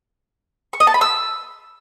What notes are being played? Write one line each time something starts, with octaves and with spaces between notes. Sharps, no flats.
C#6
D#5
A5
B5
E6